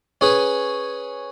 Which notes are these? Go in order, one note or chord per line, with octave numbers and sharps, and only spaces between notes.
C#4 G#4 B4